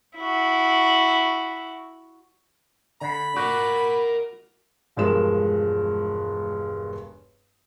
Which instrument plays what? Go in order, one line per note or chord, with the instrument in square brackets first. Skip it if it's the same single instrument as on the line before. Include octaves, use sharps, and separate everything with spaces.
[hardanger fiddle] E4 F#4
[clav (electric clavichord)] D3 [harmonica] B5
[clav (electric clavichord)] F#4 [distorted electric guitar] A#4 D5
[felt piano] E1 G2 F3 G#3 A#4 E7